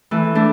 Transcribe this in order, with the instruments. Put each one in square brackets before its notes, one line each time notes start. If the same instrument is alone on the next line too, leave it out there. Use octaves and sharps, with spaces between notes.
[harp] E3 A3
A3 D4